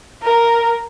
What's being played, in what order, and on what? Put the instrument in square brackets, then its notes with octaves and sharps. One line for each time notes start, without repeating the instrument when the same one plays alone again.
[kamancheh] A#4